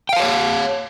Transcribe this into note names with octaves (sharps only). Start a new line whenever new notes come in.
C#5 F5 G5 A5